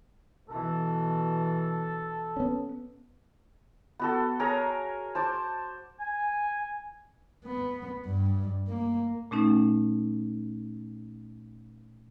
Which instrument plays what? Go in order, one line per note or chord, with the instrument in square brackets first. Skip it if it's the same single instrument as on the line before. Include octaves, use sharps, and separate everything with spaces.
[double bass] B2 E3 [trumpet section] A4
[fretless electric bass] B3 C#4
[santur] B3 F#4 A4
G#4 A#4 C#5 A#5
C5 A5 D6
[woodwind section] G#5
[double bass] B3
G2
A#3
[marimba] A#2 A3 C#4 D#4